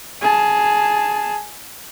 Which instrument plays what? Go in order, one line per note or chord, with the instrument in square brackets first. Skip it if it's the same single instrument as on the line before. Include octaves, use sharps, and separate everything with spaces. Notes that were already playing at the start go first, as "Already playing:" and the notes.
[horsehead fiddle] G#4 A5